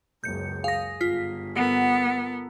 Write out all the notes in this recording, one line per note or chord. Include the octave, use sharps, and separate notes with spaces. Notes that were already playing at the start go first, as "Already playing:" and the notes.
F#1 C#2 G6 C#7
G#4 F5 D#6 A#6
G1 F4 B6
B3 A4 A#4 F#5